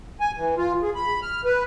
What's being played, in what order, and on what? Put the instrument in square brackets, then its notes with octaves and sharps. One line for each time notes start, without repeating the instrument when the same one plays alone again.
[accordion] G#5
E3
F4
G#4
B5
F6
B4